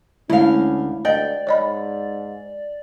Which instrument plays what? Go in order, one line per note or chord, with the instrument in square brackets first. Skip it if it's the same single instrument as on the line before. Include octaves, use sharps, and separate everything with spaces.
[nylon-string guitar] D2 F5 [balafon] G#3 [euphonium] C#4 [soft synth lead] E4
[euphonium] D2 [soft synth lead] D5 [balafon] D#5 [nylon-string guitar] G5
[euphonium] G#2 [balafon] C#5 D#5 B5